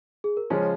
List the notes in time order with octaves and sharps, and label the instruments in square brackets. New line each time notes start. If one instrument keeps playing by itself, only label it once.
[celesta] G#4
A#4
[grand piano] C#3 F3 G#3 C#4 [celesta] C#5